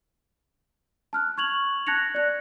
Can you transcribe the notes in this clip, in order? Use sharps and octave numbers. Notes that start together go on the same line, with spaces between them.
A5 F6 F#6
C#6 G#6 F7 F#7
A5 F#6 G#6 A#6 C#7 F7
D5 F#6